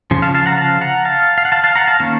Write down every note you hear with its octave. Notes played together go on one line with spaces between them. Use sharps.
C#3 F3
F5 A5
F5 A5
F#5 A#5
F5 A5
F#5 A#5
F5 A5
F5
F#5
F5 A5
F5 A5
F#5 A#5
F5 A5
D#3 A#3 C#4 F5 A5